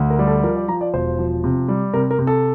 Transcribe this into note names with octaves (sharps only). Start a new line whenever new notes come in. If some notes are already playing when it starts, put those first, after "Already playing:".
Already playing: D2
A#4
G3
A4
F3 A#4
D5
F3 A#5
D5
E1 C5
F3
C3
G3
C3 A#4
A#4
C3
A4